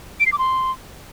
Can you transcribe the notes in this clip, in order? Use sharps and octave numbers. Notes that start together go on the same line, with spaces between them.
D7
C7
D6
C6